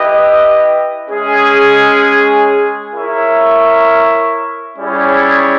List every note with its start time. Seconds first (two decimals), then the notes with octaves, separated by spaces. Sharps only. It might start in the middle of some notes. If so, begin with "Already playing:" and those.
Already playing: E4 G4 B4 D#5
1.10 G#3 C#4 G#4
2.93 E4 A#4 C#5 E5
4.77 G3 C#4 E4 G#4 C#5